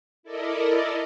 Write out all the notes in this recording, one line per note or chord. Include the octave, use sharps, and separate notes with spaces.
E4 A4 A#4 D5 D#5